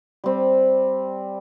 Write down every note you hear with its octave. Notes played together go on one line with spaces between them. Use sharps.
G3 C4